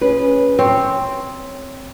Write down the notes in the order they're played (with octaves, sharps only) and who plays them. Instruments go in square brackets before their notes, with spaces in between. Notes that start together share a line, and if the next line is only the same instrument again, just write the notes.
[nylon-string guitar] C#4 G#4 B4
[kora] C4 [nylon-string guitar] C#5